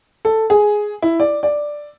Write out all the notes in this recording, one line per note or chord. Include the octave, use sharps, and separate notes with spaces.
A4
G#4
E4
D5
D5